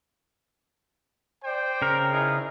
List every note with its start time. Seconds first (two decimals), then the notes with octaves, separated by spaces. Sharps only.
1.43 C5 D5 G5
1.82 C#3 A#4
2.12 D#4 E4 G#4